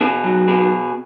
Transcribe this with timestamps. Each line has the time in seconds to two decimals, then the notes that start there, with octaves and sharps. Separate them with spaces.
0.01 B2 G#4
0.24 F#3
0.48 B2 G#4